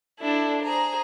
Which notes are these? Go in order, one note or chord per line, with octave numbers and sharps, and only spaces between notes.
D4 E4 A4
G#4 C5 A#5